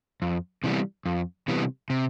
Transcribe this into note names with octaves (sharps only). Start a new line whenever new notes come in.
F2
C3 E3 G3 B3
F2
C3 E3 G3 B3
C3